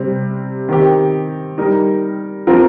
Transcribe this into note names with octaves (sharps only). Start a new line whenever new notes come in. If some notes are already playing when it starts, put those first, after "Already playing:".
Already playing: C3 G3 C4
D#3 C4 G4
G3 D#4 A#4
F3 C4 F4 A#4